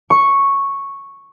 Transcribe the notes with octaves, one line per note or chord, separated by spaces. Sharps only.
C#6